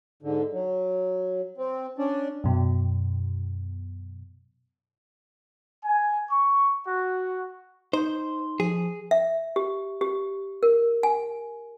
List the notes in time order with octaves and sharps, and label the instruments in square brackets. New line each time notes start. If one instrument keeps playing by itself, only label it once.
[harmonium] G#2 D3
F#3
C4
C#4 D4 D5
[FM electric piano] F#2 B2
[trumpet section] G#5
C#6
F#4
[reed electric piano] D#4 [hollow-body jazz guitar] C5 [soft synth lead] C6
[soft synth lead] F3 [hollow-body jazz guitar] G#4
[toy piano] E5
G4
G4
A#4
G#5